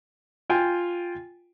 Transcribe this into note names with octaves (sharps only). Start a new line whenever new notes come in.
F4 G5 G#5